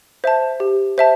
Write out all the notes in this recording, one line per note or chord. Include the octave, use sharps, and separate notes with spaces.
C5 E5 A5
G4
C5 E5 A5